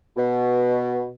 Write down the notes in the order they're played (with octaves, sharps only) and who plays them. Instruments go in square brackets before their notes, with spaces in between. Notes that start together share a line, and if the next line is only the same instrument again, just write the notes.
[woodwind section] B2